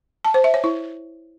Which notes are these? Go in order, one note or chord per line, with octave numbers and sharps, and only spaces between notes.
A5
C5
E5
C#5
E4